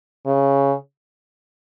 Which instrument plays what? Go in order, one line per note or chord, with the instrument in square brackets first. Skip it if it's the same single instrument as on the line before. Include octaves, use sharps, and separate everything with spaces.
[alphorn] C#3